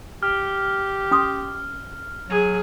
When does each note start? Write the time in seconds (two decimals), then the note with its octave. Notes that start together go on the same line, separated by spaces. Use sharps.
0.23 G4 F6
1.11 C#4 C6 D#6
2.30 F#3 G#4